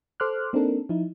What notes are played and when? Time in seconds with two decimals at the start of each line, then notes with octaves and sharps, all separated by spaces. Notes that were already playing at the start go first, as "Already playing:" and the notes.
0.20 A4 C5 C6 D6 F6 F#6
0.53 A#3 C4 D4 D#4 A4 A#4
0.89 F3 D#4 E4